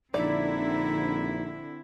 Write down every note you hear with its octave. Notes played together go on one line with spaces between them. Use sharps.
A#1 D3 C4 D#4 E4 D5